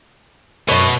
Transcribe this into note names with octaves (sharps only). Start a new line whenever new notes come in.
F#2 B2 C#5